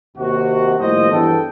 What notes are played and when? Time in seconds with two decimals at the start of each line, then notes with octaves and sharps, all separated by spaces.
0.16 D#2 C3 F#4
0.79 D#2 A2 F3 G3 C5 D#5
1.11 E2 G2 A4 G5